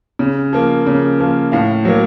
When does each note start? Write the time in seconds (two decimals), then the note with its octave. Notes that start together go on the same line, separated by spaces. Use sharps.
0.19 C#3
0.53 F3 A#3
0.87 C#3
1.20 F3 A#3
1.52 A2 F5
1.85 F#3 A#3